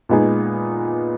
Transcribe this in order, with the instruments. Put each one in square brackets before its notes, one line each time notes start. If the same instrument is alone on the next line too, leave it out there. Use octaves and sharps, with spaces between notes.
[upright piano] A#2 G#3 B3 D#4 G#4